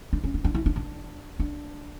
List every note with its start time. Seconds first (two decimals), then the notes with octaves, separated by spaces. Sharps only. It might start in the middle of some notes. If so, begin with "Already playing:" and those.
0.13 D4
0.24 C#4
0.34 D4
0.44 D4
0.54 E4
0.66 D4
0.76 D4
1.40 D4